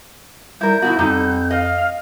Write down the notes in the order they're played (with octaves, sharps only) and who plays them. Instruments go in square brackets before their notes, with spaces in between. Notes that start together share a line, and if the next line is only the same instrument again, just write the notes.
[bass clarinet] G3 [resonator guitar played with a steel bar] E4 A#4 [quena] G6
[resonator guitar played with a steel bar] B2 E4 F#4 [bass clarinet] B3
[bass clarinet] F2 [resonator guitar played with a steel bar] G3 D#4 A4
[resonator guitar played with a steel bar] D#5 [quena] F5